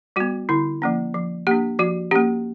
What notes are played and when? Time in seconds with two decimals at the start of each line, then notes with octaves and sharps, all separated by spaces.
0.16 G3 B3 F#4
0.49 D3 E4
0.82 F3 A#3 C#4
1.14 F3
1.47 A#3 D4 G4
1.79 F3 F#4
2.11 A#3 C#4 G4